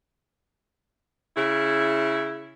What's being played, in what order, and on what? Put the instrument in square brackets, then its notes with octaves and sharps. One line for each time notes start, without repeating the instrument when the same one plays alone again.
[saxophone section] C#3 E4